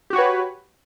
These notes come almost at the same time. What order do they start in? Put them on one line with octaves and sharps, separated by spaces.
G4 F#4 C#5 B4